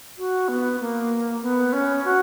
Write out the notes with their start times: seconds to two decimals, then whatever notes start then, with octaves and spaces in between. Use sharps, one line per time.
0.18 F#4
0.48 B3
0.80 A#3
1.42 B3
1.73 C#4
2.04 F#4